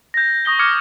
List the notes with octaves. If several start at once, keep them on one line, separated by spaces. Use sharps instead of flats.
G6 A#6
C#6 D#6 A#6 G7
D6 F6 G#6 C#7